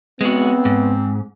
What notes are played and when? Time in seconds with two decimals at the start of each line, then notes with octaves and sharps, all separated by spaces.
0.21 G#3 B3 C4 F#4
0.65 G#2